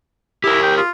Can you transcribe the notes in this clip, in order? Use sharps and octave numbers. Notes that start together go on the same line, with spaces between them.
E4 G4 A#4
G5
F4